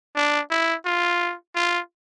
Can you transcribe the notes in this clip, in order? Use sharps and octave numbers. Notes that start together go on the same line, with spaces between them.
D4
E4
F4
F4